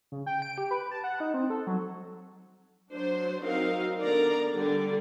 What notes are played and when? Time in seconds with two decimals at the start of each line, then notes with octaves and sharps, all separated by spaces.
0.12 C#3
0.26 G5
0.42 D7
0.58 G4
0.71 B4
0.91 A5
1.04 F#5
1.20 D#4
1.34 C4
1.50 A4
1.67 F#3
2.92 F#3 D4 C5
3.41 F#3 C4 D#4 F#4 A#4 F5
4.01 D3 B3 A#4 D5 A#5
4.53 D3 G3 D5